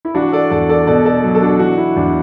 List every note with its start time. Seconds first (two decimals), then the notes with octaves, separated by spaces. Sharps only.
0.05 E4
0.15 E3 D4 F#4
0.32 A4 D5
0.51 E2 A4 D5
0.69 A4 D5
0.87 B2 A4 D5
1.05 A4 D5
1.24 F#3
1.35 A4
1.42 D4 F#4
1.59 E3 D4 F#4
1.78 E4
1.96 E2 D4